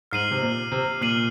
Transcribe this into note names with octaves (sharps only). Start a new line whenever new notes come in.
G#2 F6 C7 D#7 F#7
C3
A#2
C3
A#2 F6 C7 D#7 F#7